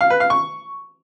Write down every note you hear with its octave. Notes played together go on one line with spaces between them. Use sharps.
F5
B4
F5
C#6